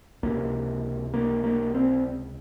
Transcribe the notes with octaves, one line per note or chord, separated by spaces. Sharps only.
C#2 C3 A#3
A#3
A#3
C4